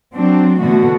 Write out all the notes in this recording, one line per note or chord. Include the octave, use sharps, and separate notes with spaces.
F#3 C4 D4
B2 D3 E3 A3 F#4